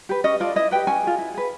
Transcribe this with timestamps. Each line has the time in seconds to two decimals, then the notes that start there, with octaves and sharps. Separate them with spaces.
0.09 G4 B4
0.24 C#4 D#5
0.40 F4 A4 D5
0.56 E4 D#5
0.71 G4 B4 G5
0.87 C#4 G#5
1.03 F4 G#4
1.18 E4
1.34 G#4 B4